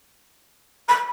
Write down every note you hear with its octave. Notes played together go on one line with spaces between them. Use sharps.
B5